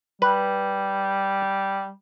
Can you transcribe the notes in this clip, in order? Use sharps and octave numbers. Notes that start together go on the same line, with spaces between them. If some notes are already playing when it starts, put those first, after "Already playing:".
G3 B4